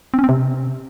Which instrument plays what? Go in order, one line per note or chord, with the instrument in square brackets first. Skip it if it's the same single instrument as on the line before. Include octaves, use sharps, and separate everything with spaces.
[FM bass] C4
C#4
C4
C3